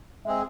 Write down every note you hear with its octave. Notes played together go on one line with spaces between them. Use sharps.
G#3 C4 G#4 E5